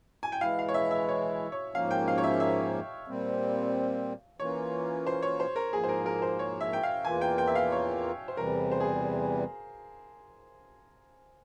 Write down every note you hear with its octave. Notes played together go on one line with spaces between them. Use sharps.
G#5
G5
E3 G#3 E4 F5
F5
C#5
E5
E5
C#5
C#5
G#2 F3 A#3 C#4 F5
G5
F5
C#5
E5
E5
A#2 G3 C4
E3 A#3 C#4 F4 C#5
C5
C#5
C5
A#4
G#2 F3 A#3 G#4
C5
A#4
A#4
C5
C#5
E5
G5
F5
E2 E3 A#3 F4 G#5
G5
G5
E5
F5
C#5
C5
E2 C3 E3 G3 A#4
C5
G#4